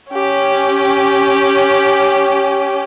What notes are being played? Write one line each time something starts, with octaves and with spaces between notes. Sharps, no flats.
C#4 G4